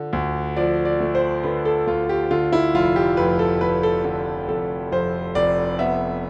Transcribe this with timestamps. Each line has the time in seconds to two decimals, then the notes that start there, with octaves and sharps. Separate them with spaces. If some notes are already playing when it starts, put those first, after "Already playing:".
Already playing: D3 F3
0.13 D2
0.56 F3 D5
0.85 D5
1.00 A3
1.15 C5
1.43 D3 B4
1.65 A4
1.87 D2 F4
2.09 G4
2.31 D3 F4
2.53 E4
2.74 F1 F4
2.96 G4
3.17 F2 B4
3.39 A4
3.61 F1 B4
3.83 A4
4.04 D3 A4
4.48 F1 A4
4.92 F2 C5
5.35 F1 D5
5.79 B3 E5